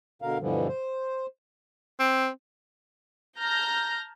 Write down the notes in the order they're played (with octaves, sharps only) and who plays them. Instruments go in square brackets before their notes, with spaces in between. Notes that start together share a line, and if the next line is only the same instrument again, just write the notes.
[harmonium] B2 D3 A#4 F5
G2 B2 D3 E3 F3 G3
C5
[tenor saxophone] C4
[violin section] A5 A#5 F6 G6 A#6